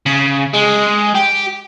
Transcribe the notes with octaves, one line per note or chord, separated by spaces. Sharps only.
C#3
G#3
G4